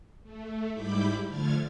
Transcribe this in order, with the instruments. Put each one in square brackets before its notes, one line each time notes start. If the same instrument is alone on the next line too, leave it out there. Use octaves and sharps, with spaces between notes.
[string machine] A3
G#2 G3 E4 B5 D6 G6
D3 F3 A3 F6 G#6 A6